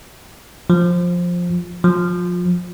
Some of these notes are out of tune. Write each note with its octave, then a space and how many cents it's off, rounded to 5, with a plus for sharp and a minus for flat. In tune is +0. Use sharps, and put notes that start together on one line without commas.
F3 +10
F3 +25